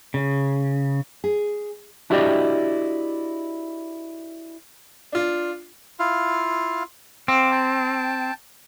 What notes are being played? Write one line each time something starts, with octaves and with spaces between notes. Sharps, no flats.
C#3
G#4
D4 E4 F#4 G4 D5 D#5
D4 F4
E4 F4 F5
C4 F5 D6
G5 A5